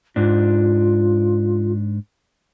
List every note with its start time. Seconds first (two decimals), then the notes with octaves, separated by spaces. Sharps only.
0.16 G#2 D4 F4